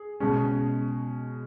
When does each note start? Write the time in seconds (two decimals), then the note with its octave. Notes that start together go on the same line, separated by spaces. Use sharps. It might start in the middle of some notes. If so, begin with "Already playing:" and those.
Already playing: G#4
0.20 B2 G#3 C#4